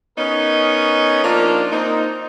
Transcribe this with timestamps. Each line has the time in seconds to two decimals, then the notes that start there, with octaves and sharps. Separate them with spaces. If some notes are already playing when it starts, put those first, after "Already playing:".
0.18 B3 C#4 D#4 A#4 C#5
1.24 F3 A#3 D4 D#4 F4
1.72 A#3 C4 D#4